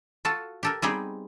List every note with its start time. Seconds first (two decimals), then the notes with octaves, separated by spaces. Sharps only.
0.25 F4 F#4 A4 A5
0.63 G4 A4 A#4
0.82 G3 B3 C4 D#4 G4 G#4